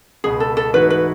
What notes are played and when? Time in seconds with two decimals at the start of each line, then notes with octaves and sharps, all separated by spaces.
0.24 C#2 B2 G#3 B3 G#4
0.40 A4
0.57 A4
0.74 G#2 E3 A3 D#4 F#4 B4
0.90 B4